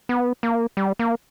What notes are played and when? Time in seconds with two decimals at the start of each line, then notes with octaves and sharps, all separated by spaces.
0.09 B3
0.43 A#3
0.77 G3
0.99 A#3